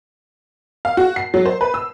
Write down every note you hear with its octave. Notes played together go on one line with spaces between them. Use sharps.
F5
F#4
C7
F#3
C5
B4
E6